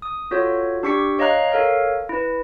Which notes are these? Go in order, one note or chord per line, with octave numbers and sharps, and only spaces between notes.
D#6
F4 F#4 A4 C#5
D4 G4 C#6 D6 B6 C#7
C#5 D#5 F5 A#5 F#6
A4 A#4 C#5 F5
E4 B4